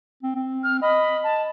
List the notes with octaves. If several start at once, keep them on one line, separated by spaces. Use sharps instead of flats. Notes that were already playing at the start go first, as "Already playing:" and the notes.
C4
C4
F6
D#5 B5
A5